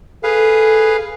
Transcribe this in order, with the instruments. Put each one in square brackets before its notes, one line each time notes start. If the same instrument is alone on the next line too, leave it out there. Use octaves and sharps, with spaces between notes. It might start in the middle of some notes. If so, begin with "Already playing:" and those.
[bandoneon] G#4 B4 F5 [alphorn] A4